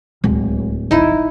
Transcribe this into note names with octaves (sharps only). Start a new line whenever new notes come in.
D1 C#2 G#3
D#1 G#1 D#4 E4